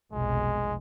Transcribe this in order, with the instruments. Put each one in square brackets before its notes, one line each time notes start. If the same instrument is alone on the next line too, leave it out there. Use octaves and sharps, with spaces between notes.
[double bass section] F1 B1 [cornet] G#3